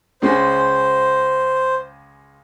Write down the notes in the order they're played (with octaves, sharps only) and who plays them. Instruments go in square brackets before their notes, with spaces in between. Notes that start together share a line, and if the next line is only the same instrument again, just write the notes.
[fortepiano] C#2 C#3 G#3 [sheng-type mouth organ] C5